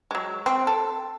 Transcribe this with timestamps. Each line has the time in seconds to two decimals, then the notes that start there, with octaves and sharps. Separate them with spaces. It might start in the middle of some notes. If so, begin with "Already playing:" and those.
0.11 F#3 G#3
0.46 C4
0.67 A4